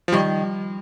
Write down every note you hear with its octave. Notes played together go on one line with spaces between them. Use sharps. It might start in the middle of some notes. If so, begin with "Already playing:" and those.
F3
D#3 G3